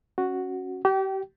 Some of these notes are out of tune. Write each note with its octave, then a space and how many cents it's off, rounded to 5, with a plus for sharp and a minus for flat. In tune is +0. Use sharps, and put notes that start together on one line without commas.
C#4 -15 F#4 +0
G4 -35 G5 -20